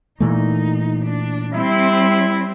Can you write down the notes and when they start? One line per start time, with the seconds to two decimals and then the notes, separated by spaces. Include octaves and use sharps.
0.20 A#2 E3 A3 D#4
1.04 D4
1.53 G3 C4 E4